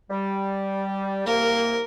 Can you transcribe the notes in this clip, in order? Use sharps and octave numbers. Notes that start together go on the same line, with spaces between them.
G3
C2 A#3 A#4